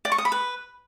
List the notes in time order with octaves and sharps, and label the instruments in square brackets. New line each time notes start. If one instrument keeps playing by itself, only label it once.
[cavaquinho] D5
C#6
D#6
B5
B4